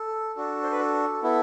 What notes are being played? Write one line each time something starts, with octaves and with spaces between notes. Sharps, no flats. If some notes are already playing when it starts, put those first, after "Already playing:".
Already playing: A4
D4 F#4 A4
C5
B4
A4
B3 E4 A4